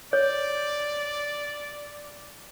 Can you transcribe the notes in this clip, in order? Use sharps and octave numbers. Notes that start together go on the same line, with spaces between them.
C#5 D5